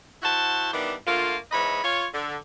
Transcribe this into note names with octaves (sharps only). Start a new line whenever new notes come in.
E4 F#4 C5 F#5 A5
D#3 E3 G3 B3 D4
D3 A3 A#3 F4
G#2 E3 C#5 D#5 B5
F4 C#5
D3